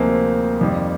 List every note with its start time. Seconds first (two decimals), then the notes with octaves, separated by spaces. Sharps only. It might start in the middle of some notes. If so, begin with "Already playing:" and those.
Already playing: D2 C3 F3 G#3 A#3 C4 D#4
0.61 F2 D#3 G3 A#3